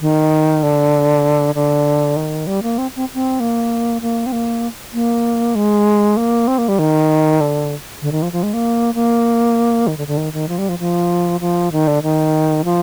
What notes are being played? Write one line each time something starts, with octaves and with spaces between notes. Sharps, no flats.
D#3
D3
D3
D#3
G3
A#3
C4
C4
C4
A#3
A#3
C4
A#3
A#3
G#3
A#3
C4
A#3
G3
D#3
D3
D3
D#3
F3
F3
G#3
A#3
A#3
D#3
D3
D3
D#3
D#3
F3
G3
F3
F3
F3
D#3
D3
D#3
F3